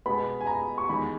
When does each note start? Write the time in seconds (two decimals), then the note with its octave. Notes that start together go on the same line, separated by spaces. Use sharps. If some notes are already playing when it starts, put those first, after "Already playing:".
0.06 B2 G#3 B3 B5
0.41 G#5
0.47 A#5
0.78 C#6
0.89 E2 D#3 G#3 B5